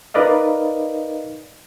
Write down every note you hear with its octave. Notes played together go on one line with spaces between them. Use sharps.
D#4 A#4 B4 D5 D#5 F5